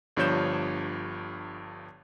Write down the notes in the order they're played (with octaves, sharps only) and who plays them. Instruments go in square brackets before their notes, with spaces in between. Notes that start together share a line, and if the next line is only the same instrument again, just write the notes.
[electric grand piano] G1 G2 F3 C#5 G6 E7